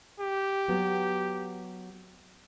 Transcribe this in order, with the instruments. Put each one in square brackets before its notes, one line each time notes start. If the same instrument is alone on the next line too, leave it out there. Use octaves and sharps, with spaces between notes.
[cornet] G4
[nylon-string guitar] F#3 B3